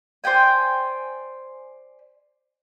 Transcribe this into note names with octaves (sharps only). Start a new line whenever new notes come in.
C5 D5 G5 G#5